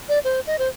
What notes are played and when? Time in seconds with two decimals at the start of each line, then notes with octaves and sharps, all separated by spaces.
0.09 D5
0.24 C5
0.47 D#5
0.59 C5